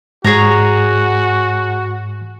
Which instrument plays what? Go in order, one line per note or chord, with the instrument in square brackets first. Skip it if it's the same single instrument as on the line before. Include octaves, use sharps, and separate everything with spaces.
[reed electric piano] G#2 [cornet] F#4 [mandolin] G#4 C#5 A#5